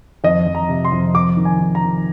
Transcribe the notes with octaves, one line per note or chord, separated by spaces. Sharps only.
F2 D#5
F2
A#5
C3
C6
F2
F2 D6
D#3
G#5
D#3
A#5
D#3